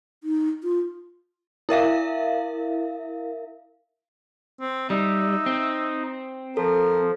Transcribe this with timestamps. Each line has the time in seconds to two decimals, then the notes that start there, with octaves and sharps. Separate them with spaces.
0.24 D#4
0.63 F4
1.69 E4 A#4 E5 F5
4.61 C4
4.90 G3 D#4 E5
5.46 C4
6.57 F3 A4 A#4